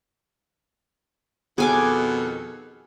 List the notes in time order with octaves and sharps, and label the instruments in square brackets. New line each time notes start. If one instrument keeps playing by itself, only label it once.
[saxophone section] F2 D#3 A4 [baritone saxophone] B2 [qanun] G#4 G#5 D6